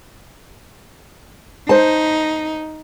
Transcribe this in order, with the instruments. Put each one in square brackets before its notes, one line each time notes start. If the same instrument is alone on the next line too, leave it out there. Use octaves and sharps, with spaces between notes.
[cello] D#4 [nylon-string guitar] C5 A5